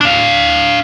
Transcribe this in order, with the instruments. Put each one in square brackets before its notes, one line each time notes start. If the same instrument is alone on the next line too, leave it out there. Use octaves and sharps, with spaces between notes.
[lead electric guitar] D4 F5